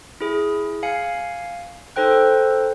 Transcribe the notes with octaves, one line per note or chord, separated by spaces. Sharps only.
E4 G#4
F5 G#5 C#7
D#4 A4 C5 G5 F#6